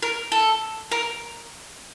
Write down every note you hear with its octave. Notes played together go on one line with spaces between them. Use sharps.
A#4
A4
A#4